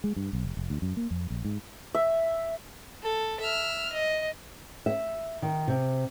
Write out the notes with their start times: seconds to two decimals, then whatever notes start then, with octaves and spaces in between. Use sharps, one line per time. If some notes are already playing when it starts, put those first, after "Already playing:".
0.04 G#3
0.16 G2
0.33 B1
0.45 F1
0.57 F1
0.70 D2
0.82 F#2
0.97 A#3
1.11 F2
1.30 A#1
1.45 G#2
1.95 E5
3.03 A4
3.41 E5 F6
3.93 D#5
4.86 E5
5.42 D#3
5.68 C3